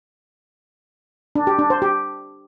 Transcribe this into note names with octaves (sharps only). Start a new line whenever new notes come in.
D4
G4
D4
C5
G4